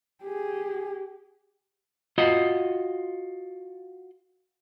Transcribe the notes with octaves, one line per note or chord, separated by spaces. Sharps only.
G4 G#4
F4 F#4 D#5